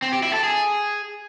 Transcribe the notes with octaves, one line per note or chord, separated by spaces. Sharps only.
C4
G4
E4
A4
G#4